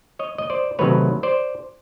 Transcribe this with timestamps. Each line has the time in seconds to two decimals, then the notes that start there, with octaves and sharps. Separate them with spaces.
0.19 C#5 D#5
0.38 D#5
0.50 C5 D5
0.79 C3 D#3 F#3 A3 B4 C#5
1.23 C5 D5